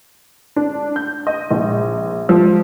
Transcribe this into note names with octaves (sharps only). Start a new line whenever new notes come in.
D4
G6
D#5
A#1
F3